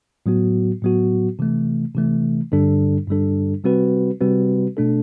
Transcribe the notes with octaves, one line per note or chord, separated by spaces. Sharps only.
A2 F#3 B3 F#4
A2 F#3 B3 F#4
C3 E3 A3
C3 E3 A3
G2 D3 G3 D4 A4
G2 D3 G3 D4 A4
C3 G3 C4 F#4 B4
C3 G3 C4 F#4 B4
B2 A3 D4 A4